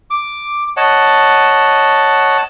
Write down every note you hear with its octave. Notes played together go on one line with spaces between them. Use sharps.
D6
C#5 D#5 F#5 A5